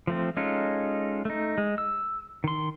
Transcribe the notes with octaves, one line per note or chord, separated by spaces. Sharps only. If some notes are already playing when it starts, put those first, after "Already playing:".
F3 A3 C4
G#3 C#4 D#4 F4 A4
A3 D#4
G#3
E6
D#3 C6